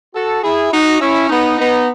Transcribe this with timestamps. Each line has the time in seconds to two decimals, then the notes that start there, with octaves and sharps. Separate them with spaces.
0.14 F#4 A4
0.43 E4 G#4
0.72 D#4 F#4
1.00 C#4 E4
1.30 B3 D#4
1.58 B3 D#4